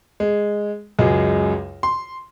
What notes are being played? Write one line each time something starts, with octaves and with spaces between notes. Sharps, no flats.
G#3
C#2 F#2 G#3
C6